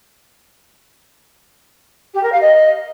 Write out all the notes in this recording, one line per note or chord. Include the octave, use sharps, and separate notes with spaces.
G4
A#4
F5
D#5